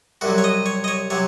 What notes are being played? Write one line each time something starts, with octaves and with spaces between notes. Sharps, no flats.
C2 C3 F#3 F#4
C#5
D#5
C#5
D#5
C#5
C3 F#3 C#5